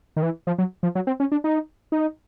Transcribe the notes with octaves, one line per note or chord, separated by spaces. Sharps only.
D#3
E3
F3
F#3
F3
F#3
C4
C#4
D4
D#4
D#4